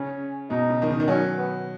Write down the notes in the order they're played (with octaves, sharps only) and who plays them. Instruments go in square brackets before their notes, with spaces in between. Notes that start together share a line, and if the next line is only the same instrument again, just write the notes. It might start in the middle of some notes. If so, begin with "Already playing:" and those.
Already playing: [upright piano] C#3 [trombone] C#4
[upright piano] B2 [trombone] D#4
[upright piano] C#3
D#3
C#3
D#3
[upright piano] F#3 [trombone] C#4
[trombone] B3